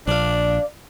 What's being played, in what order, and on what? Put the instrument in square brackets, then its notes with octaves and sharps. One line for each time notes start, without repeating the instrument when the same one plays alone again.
[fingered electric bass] A#1 [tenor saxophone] D4 [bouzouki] D5 F5